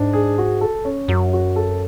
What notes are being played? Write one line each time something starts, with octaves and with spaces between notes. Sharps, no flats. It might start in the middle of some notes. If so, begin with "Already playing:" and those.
Already playing: G#2 D4
G#4
F#4
A4
C#4
F#2 F#3
F#4
A4